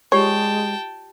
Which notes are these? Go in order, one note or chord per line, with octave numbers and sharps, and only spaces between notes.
G#3 F4 G4 C#5 D5 G5 A5